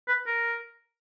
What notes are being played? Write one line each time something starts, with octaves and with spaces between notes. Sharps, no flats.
B4
A#4